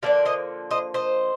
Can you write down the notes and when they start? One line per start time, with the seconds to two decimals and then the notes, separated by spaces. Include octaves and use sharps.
0.03 D3 F3 A#3 D4 D5 F5
0.25 C5 D#5
0.71 C5 D#5
0.94 C5 D#5